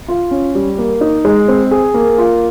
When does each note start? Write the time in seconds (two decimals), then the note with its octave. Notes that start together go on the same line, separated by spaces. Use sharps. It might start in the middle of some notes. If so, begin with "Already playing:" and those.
0.08 F4
0.31 C#4
0.55 G3
0.78 A#3
1.01 D#4
1.25 G#3
1.48 C4
1.71 G#4
1.94 A#3
2.18 F4